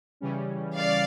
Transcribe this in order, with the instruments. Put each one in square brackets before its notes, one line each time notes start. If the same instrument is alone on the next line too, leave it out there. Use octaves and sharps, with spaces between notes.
[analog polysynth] C#3 E3 G3 C#4
[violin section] D5 F5